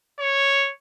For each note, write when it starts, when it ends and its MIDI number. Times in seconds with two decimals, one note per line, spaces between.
0.19 0.71 73